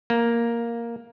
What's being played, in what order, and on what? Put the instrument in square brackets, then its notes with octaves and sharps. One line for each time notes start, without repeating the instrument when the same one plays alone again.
[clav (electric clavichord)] A#3